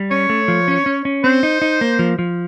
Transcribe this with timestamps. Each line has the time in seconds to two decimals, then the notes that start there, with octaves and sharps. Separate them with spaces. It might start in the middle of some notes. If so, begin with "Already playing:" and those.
Already playing: G3
0.11 C#4 C#5
0.30 A3
0.48 F3
0.68 C#4
0.86 C#4
1.05 C#4
1.24 C4 C5
1.43 D#4
1.62 D#4
1.81 A#3
1.99 F3
2.19 F3